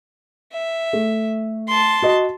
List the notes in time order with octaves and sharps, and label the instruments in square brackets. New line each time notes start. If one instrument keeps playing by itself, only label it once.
[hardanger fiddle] E5
[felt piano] A3
[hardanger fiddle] A5 C6
[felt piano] F#4 D#5